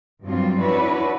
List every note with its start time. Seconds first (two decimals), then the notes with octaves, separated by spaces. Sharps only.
0.24 G2 F3 F#3 C4 F4
0.60 D4 E4 F#4 B4 C#5